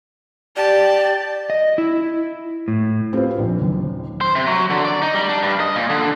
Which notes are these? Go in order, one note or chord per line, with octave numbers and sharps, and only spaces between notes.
G4 D5 A5
D#5
E4
A2
C4 F4 G4 B4 C5
A#1 A#2
F#1 D#2
C5
C3
F#3
D3
D5
D#4
G3
D4
G2
D#5
A#2
D3